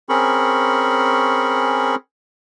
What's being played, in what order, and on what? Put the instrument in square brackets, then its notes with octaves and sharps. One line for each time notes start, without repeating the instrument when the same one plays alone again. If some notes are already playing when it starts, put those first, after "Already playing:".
[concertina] C4 C#4 G#4 A#4 B5 C#6